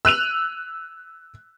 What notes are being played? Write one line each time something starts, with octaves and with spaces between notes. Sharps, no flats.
E6 F#6 D#7 F7